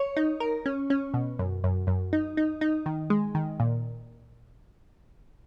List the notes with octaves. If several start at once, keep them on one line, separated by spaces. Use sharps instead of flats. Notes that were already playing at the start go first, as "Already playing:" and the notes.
Already playing: C#5
D#4
A#4
C#4
C#4
B2
F#2
F#2
F#2
D#4
D#4
D#4
D#3
G#3
D#3
A#2